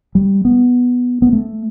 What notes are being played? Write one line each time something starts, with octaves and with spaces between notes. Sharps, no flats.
G3
B3
B3
A3